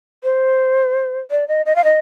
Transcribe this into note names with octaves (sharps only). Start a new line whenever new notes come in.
C5
D5
D#5
D#5
F5
D#5